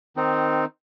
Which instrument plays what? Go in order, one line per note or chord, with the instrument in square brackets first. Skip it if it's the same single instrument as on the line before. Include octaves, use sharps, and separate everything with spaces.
[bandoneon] D#3 C4 D#4